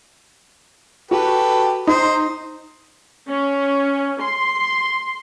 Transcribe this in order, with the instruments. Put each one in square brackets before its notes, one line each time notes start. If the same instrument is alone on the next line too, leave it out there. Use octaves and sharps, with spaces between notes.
[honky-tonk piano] F#4 [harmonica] G4 A4 B4
[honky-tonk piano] D#4 [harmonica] C5
[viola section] C#4
C6